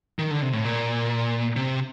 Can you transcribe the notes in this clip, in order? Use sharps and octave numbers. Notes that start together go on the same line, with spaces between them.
D#3
D3
C3
A2
A#2
C3